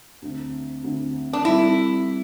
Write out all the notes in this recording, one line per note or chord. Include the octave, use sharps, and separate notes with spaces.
D2 D3 C4
D2 D3 C4
D4
C2 C3 G3 C4 E4 A4